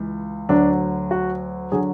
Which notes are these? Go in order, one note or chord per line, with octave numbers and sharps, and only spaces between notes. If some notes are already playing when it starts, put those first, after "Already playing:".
Already playing: C#2 E3
D2 D3 F#3 D4
F#4
D3 F#3 G#4